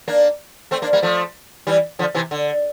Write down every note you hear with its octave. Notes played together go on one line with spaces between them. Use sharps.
A#3 D4
A3 C4
A#3 D4
G3 A#3
F3 A3
E3 G3
D3 F3
C3 E3
D3